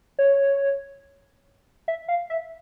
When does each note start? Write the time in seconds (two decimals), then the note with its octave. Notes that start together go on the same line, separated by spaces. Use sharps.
0.19 C#5
1.88 E5
2.08 F5
2.30 E5